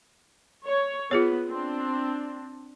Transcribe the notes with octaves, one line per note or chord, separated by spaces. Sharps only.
C#5
B3 F4 G#4 C#5
C4 D4